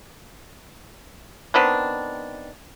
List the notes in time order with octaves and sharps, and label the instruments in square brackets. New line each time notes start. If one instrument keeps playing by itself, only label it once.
[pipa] D#3 B3 C4 D4